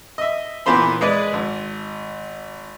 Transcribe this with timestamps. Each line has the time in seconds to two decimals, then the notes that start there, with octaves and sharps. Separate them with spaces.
0.18 D#5 E5
0.66 A#2 E3 B3 C4 C5 B5
1.01 G#3 G#4 B4 D5
1.33 G#1